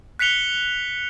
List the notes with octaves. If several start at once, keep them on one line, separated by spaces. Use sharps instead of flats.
F#6 B6 C#7 F7 G7